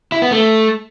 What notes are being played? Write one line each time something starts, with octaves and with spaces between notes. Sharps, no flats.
E4
B3
A3